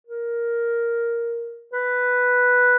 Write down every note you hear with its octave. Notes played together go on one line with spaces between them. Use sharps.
A#4
B4